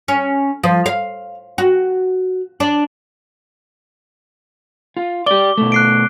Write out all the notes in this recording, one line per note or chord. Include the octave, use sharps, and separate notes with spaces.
C#4
F3
F5
F#4
D4
F4
G4 D5 D6 G7
B2 A3
F#6 C7 D7